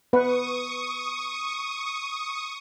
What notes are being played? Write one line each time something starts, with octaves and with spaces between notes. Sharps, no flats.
B3 B4 F#5 C#6 D#6